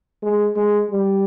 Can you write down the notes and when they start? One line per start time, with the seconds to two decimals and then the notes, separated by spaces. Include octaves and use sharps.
0.22 G#3
0.56 G#3
0.91 G3